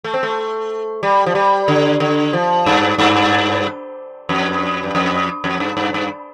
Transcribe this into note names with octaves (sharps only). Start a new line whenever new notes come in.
A3
C4
A3
G3
F3
G3
D3
D3
F3
G2
G2
F2
G2
F2
F2
G2
G2
G2